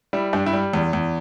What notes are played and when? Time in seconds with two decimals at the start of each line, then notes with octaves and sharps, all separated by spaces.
0.13 G3 E4
0.33 G2 D4
0.46 E4
0.53 G3
0.73 E2
0.93 E2